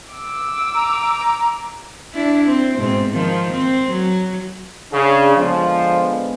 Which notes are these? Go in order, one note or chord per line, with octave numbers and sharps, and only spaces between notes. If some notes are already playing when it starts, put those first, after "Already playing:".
D6 E6
A#5
D4 E4
C4
G#2 B2 C4
D#3 F3
C4
F#3
C#3 D4 G#4
D3 F3 G#3 B3